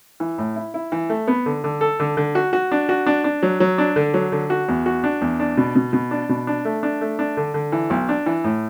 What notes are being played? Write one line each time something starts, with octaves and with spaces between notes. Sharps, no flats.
E3
A2
E4
E4
E3
A3
B3
D3
D3
A4
D3
D3
F#4
F#4
D4
F#4
D4
D4
F#3
F#3
D4
D3
F#3
D3
F#4
E2
F#4
D4
E2
D4
B2
B2
B2
D4
B2
D4
A3
D4
A3
D4
D3
D3
E3
B1
D4
E3
A2